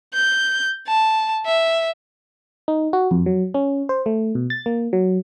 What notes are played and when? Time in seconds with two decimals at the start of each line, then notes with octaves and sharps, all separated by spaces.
0.14 G6
0.87 A5
1.45 E5
2.68 D#4
2.93 F#4
3.11 F2
3.26 F#3
3.54 C#4
3.89 C5
4.06 A3
4.35 B2
4.50 A6
4.66 A#3
4.93 F#3